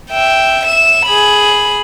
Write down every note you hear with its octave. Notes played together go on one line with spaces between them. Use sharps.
E5 G5
E5 E7
G#4 B5